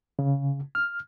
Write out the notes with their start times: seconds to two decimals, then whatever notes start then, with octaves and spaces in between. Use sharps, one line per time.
0.19 C#3
0.75 F6